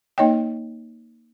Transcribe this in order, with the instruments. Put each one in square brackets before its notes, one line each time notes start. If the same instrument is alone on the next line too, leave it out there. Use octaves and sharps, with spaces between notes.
[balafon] A#3 D#4 C#5 D#5 G5